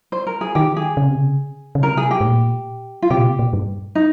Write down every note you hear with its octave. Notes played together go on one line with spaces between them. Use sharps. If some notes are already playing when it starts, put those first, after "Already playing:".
C5
A#4
G#4
D#3 G4
G#4
C#3
C3
C#3
C#3
C3 A#4
G#4
G4
G#2
A#2
F4
C3 G4
A#2
C3
A#2
G2
D#4